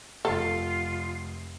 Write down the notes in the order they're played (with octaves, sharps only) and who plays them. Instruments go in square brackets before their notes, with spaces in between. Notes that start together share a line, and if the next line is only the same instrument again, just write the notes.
[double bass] F1 [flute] F4 [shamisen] A4